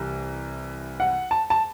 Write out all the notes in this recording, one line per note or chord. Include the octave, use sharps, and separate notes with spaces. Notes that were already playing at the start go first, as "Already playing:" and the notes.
Already playing: C2 C3 E3
F#5
A5
A5